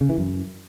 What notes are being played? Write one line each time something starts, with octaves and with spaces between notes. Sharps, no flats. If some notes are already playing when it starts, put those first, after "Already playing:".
C#3
E3
F#2